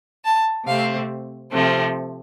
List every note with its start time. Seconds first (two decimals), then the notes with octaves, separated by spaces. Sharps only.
0.24 A5
0.67 C3 A3 C4 F5
1.51 C3 F3 A3 C4